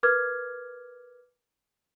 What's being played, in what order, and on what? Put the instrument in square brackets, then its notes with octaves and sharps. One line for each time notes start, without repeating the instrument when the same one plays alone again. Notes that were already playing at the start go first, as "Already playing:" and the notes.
[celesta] A#4 B4 D6 F6 G#6